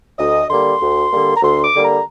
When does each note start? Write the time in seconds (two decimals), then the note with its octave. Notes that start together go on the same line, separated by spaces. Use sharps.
0.18 D2 D#5
0.49 D3 G3 A#3 C6
0.81 D2
1.12 D3 G3 A#3
1.36 A#5
1.42 D2 C6
1.63 D6
1.74 D3 G3 A#3
1.84 A#5